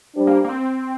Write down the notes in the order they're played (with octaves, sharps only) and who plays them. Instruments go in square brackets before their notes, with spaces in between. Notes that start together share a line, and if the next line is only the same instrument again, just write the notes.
[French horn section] G3 D4 G4 C5
[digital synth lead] A#3
A#3
C4